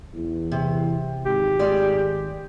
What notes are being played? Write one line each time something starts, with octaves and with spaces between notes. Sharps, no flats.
E2 E3
C3
G#1 G4
G#3 D5